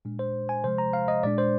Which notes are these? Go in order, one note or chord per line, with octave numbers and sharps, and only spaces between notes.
A#2 G#3 D4
C5
G#5
C3 F3 G#3 C5
A#5
F5
D#5
A#2 G#3 D4 D5
C5